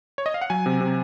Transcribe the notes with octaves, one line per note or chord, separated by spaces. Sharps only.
C#5
D#5
F5
F#5
F#3 G#5
C3
C3